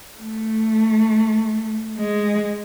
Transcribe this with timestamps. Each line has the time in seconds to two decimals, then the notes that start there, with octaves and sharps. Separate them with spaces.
0.17 A3
1.98 G#3